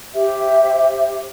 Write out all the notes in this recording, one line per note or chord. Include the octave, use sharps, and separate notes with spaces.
G4 C5 E5